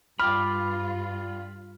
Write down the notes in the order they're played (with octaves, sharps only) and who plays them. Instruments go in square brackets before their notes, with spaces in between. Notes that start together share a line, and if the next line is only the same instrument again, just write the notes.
[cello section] G2 F4 [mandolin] D4 G4 [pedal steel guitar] B5 [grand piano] F6